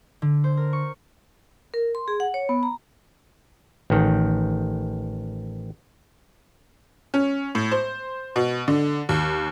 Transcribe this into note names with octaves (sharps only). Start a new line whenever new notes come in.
D3
C5
A#4
C#6
A#4
C6
G#4
F#5
C#5
B3
A#5
A1 D#3
C#4
A2
C5
B2
D3
D#2